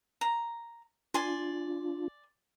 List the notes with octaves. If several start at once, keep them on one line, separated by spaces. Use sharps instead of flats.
A#5
D4 F4 D5 G#5 C6